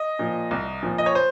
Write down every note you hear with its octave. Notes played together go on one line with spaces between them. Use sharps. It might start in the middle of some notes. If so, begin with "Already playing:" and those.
Already playing: D#5
A#2 F3
C2
A#2 F3
D#5
C#5
C5